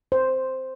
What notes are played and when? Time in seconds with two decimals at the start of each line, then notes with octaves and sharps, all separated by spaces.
0.12 C5